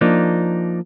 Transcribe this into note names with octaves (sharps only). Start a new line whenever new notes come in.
F3 A#3 D4 D#4